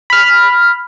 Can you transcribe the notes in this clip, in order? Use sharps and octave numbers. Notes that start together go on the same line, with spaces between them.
B5 F6